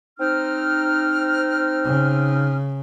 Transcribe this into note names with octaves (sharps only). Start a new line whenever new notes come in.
C4 D#4 F6
C#3